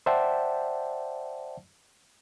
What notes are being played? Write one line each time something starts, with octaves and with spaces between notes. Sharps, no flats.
C5 D5 E5 F#5 G5 A5